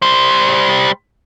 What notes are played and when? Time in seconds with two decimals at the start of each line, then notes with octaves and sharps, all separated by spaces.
0.02 G3 C5